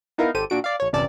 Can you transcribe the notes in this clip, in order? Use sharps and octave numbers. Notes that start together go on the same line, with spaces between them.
B3 D#4 E4 A#4 F5
G#1 G4 A4 C5 D#7
A#2 D4 F#4 D7
D5 F5
A#1 C#5
G1 E2 C3 C#4 D5 A5